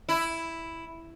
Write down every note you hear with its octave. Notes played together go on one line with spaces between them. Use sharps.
E4